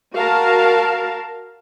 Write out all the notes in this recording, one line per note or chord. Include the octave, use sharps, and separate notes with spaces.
F#4 A#4 F5 A5